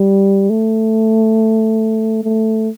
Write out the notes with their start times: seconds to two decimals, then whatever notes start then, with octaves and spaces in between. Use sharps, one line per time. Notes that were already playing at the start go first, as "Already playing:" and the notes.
Already playing: G3
0.50 A3
2.24 A3